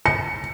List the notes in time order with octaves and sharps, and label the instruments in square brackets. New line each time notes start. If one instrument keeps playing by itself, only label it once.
[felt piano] C#7